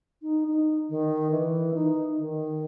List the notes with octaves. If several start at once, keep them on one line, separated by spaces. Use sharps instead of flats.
D#4
D#4
D#3
E3
D#4
D#3